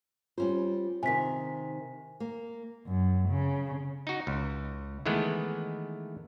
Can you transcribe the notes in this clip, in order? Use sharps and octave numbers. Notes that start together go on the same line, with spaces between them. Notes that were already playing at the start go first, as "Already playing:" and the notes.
G3 C#4 F4 C5
C3 D#3 G#5 B6
A#3
F#2
C#3
D#4 F#4
C#2
D#3 E3 G#3 A3 B3